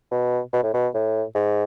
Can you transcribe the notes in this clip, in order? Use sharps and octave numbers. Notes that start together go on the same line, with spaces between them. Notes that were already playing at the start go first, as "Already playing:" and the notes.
B2
B2
A2
B2
A2
G#2